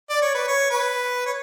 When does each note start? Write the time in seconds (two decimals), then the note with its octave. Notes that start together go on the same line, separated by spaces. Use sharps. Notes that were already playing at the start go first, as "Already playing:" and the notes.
0.10 D5
0.22 C#5
0.35 B4
0.48 C#5
0.71 B4
1.26 C#5